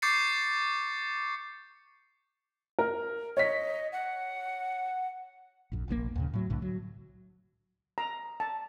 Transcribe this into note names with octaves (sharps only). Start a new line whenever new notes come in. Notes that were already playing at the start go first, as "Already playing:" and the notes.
C#6 D6 G6 A6 C7 C#7
A#4
C#5 D#5 B6
F#5
A#1 F2
F1 A#1 C3 A#3
D#2 A#2 C#3
A2 F#3
C2 A2 D3
F#3
A#5
A5